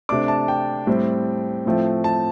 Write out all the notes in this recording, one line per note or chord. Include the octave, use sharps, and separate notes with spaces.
C3 A3 D4 D6
A5
G5
A2 G3 C4
A2 F3 A3 C4
A5